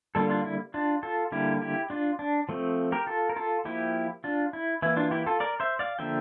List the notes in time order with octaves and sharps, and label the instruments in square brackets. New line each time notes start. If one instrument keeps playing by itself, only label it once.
[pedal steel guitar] D3 G3 A#3 F4 A4
D4 F4
E4
D4 F4
F4 A4
D3 G3 A#3 E4 G4
E4 G4
D4 F4
D4
F3 A3 C4
G4 A#4
F4 A4
A#4
F4 A4
F3 A#3 E4 G4
D4 F4
E4
E3 A#3 E4
D4 F4
E4 G4
F4 A4
A#4 D5
C5 E5
D5 F5
D3 F3 A#3 E5 G5